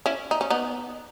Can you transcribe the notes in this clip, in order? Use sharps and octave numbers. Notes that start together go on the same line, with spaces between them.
C#4 E4
D#4
C#4
B3 D#4